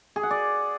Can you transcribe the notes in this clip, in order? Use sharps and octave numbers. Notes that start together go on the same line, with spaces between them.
G#4
F#5
D5